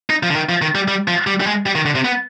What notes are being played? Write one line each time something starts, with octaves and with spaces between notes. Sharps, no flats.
D#4
F3
D3
D#3
F3
D#3
G3
G3
F3
G3
G3
G#3
G3
D#3
D3
C3
B3